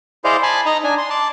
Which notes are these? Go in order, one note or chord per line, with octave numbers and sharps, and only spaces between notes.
E4 G#4 C5 D5 D#5 F5
G#5 A5 B5
D#4 D#5 A#5
D4 G#5
C6
D5 A5